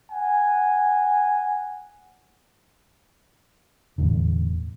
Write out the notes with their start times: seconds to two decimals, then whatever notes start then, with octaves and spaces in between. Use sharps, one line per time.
0.10 F#5 G#5
3.98 E1 E2 A2 D3